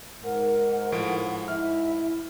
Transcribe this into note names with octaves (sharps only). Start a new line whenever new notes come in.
G#2 A#4 F#5
A2 F3 D7
E4 E5 F6